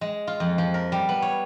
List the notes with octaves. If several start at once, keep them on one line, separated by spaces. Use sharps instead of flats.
G#3
F4
F2
F3
A#4
G3
B3
C#5